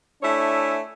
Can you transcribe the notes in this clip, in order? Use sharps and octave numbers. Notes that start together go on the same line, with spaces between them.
A3 D4 E4 C#5 G#5